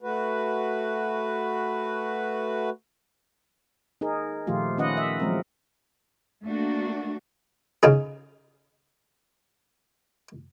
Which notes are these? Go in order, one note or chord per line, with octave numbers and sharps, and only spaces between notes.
A3 F#4 B4
D#4 G#4 A#4
A#2 D#3 F3 A3 F4 G4
D#3 C#4 F4 B4 D#5 F#5
E5
F3 F#3 G#3 A#3 C4 A#4
A3 A#3 D4 F#4
C#3 D#4 G#4